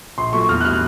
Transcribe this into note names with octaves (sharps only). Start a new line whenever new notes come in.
A#1 C6
A#2 F#3 A3 C#6
E2 F6
F#6
B2 G3 F6